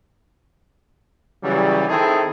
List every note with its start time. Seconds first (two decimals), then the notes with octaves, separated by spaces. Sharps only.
1.44 C#3 E3 F#3 G3
1.89 D#3 C4 D#4 E4 G#4 A4